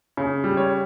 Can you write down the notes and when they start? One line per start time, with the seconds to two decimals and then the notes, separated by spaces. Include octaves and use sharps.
0.17 C#3
0.44 G3
0.57 C#5